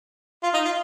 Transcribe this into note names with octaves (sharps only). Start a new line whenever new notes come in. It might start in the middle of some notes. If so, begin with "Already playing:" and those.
F4
D#4
F4